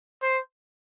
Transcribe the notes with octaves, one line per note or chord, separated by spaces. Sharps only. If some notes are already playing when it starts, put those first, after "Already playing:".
C5